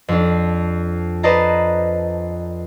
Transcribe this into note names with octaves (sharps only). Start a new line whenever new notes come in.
F2 D4
B4 C5 D5 D#5 A5 A#5